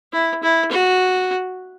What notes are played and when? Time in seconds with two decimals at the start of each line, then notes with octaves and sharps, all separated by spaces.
0.13 E4
0.43 E4
0.72 F#4